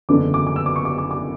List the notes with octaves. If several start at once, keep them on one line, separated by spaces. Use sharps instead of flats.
F#1 E2 D3 A3 D4 D6
D6
D6
E6
D6
C#6
D6
D6
D6